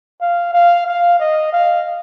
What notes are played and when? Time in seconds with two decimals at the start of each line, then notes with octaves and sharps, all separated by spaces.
0.21 F5
0.54 F5
0.86 F5
1.19 D#5
1.52 F5